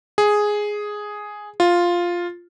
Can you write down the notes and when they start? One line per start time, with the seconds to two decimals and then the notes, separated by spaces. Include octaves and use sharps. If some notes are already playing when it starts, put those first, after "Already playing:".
0.18 G#4
1.60 F4